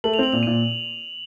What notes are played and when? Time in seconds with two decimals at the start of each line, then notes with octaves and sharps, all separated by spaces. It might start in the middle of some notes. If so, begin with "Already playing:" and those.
0.04 A3 F#7
0.14 F7
0.19 C4 F#7
0.32 A#2 F7
0.43 D#7
0.47 A#2